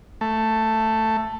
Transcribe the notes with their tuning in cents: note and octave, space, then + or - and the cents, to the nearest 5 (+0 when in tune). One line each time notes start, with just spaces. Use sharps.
A3 +10